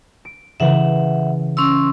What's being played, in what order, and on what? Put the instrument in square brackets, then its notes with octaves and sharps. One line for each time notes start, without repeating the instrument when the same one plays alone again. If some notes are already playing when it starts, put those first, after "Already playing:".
[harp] D7
[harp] C#3 E3 B4 [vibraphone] E5 F#5
[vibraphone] C#4 C6 E6